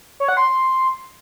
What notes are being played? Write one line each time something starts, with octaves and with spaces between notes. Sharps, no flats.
C#5
F#5
C6